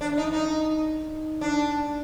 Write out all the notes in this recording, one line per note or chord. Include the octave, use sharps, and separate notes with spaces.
D4
D#4
D#4
D4